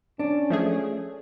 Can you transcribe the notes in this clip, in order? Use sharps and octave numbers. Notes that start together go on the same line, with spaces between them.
C#4 D4
F3 A3 G#4